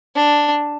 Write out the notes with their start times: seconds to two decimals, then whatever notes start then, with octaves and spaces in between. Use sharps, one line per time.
0.16 D4